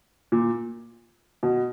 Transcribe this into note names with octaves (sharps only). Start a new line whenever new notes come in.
A#2
B2